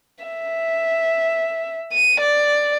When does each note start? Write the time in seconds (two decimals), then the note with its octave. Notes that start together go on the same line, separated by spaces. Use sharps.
0.24 E5
1.92 D#7
2.21 D5